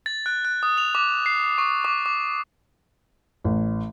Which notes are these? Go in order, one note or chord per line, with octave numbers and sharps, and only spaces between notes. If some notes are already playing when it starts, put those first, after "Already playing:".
A6
F#6
F#6
D#6
F7
D6
C7
C#6
D6
D6
A1